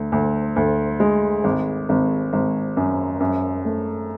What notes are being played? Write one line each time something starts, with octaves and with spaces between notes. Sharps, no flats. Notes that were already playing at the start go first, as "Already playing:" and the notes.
Already playing: D2
D2
D2
G#3
G#1
G#1
G#1
F#2
F#2
A3